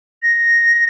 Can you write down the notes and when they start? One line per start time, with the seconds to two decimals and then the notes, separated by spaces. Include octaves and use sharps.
0.22 A#6